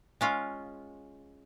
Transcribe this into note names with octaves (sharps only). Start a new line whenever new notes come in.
G#3 C#4 F4